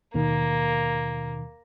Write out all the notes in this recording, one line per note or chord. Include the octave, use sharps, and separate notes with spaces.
D#2 B2 D#3 A#3